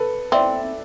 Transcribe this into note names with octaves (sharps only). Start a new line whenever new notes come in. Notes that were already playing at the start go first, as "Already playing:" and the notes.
Already playing: A4 B4
C4 D5 E5